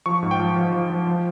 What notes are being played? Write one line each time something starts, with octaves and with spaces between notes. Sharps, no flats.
F3 C#6
G#2
G5
F3
F3
F3
F3
F3